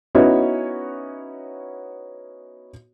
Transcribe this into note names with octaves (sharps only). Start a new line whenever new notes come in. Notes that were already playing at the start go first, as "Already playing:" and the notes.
B3 C#4 D#4 E4 F#4 C#5